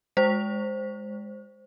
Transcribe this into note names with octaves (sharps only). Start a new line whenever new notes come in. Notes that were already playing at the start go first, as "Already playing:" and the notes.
G#3 C5